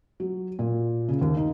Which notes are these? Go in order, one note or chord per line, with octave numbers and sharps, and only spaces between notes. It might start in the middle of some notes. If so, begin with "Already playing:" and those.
F#3
A#2
C#3
D#2
D#4